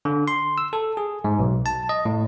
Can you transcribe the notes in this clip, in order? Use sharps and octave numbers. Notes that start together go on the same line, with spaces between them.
D3
C6
E6
A4
G#4
G#2
B1
A5
D#5
A2